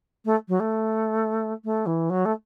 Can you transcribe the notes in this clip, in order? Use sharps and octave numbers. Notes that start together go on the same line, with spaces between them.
A3
F#3
A3
A3
E3
F#3
A3